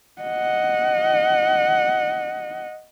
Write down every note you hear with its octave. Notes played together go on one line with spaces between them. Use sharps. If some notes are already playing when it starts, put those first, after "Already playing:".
D#5 F#5